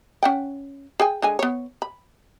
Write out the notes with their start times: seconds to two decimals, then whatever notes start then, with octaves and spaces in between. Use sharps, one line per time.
0.23 C#4 F#5 G5
1.00 G#4 G5 G#5
1.22 D3 G#3 G#5
1.39 B3 C#5
1.82 B5